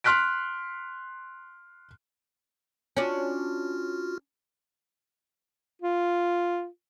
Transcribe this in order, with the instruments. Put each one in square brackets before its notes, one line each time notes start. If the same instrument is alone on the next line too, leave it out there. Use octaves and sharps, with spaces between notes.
[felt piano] C6 F6 F#6 B6 D7
[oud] C#4 D4 [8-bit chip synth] F4 F#4 F6
[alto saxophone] F4